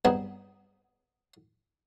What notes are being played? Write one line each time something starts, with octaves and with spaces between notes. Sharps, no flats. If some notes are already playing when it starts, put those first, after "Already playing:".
G2 B3 C4 D#4 G#4